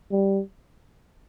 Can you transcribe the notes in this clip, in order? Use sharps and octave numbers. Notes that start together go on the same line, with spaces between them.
G3